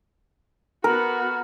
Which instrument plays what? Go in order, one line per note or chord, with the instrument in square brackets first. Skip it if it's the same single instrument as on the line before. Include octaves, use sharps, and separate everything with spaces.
[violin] B3 F#4 [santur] A#4